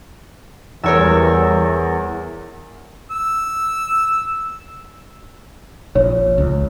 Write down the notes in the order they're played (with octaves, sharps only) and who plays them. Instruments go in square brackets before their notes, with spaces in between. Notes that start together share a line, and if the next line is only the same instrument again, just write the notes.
[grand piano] E2 [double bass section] E3 G3 [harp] A#4 C#5 E6
[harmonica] E6
[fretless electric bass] A#1 [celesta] C#5
[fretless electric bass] C#2